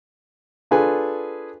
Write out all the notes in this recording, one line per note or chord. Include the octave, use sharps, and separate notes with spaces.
D4 F4 G#4 A4 B4 G#5